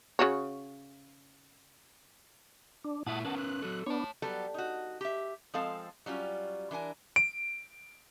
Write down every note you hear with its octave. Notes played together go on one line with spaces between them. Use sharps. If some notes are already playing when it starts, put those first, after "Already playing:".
C#3 F#4 C#5
D4
A#2 E4 E5 F#5 A5 D#6
C#4 A#4 B4 F#5 A5
F#6
F#3 A4
B3 D4 C#5 A5
F#3 G3 B3 A4
D#4 F#4
G4 E5
F3 G#3 C4 A4 F5
F#3 G3 C#4 F4
E3 D4 A#4 G#5
D7